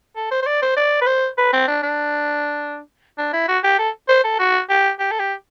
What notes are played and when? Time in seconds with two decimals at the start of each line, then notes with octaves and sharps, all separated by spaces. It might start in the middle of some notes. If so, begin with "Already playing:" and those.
0.16 A4
0.31 C5
0.42 C5
0.47 D5
0.62 C5
0.77 D5
1.01 B4
1.07 C5
1.38 B4
1.53 C4
1.67 D4
1.83 D4
3.18 D4
3.33 E4
3.48 F#4
3.64 G4
3.79 A4
4.09 C5
4.24 A4
4.39 F#4
4.70 G4
4.99 G4
5.11 A4
5.20 G4